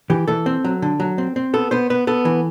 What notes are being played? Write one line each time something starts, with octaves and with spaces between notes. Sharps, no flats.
E3 G4
E3 A4
C4
F#3
D3
F#3
C4
C4
B3 A4
B3 C5
B3 B4
B3 A4
E3